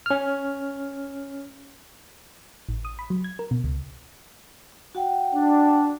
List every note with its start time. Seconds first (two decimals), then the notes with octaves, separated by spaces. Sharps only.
0.06 C#4 F6
2.69 A1
2.85 D#6
2.99 B5
3.10 F#3
3.24 G#6
3.39 A#4
3.51 B2
3.64 C#2
4.95 F#4 F#5 G5
5.34 D4